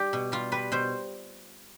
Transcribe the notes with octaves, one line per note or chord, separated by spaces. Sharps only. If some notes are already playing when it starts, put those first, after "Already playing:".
Already playing: G3 G4
B2
G3 F4
G3 B4
B2 C5